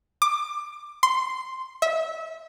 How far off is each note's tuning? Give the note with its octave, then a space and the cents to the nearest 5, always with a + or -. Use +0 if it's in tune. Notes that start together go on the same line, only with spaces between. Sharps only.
D6 +20
C6 -10
E5 -25